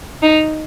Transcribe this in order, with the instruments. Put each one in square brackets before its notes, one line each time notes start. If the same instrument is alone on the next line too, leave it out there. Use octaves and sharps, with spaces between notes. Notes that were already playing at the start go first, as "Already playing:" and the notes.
[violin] D#4